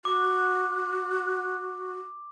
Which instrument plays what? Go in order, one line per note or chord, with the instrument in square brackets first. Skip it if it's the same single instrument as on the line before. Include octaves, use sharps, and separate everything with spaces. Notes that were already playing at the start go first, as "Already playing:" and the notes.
[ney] F#4 [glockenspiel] D6